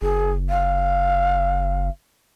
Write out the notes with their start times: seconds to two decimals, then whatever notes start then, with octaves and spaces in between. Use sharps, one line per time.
0.02 F#1 G#4
0.49 F5